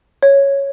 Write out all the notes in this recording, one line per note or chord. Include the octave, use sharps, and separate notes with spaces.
C#5